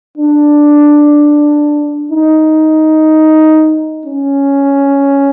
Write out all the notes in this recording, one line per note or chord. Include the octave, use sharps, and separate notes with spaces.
D4
D#4
C#4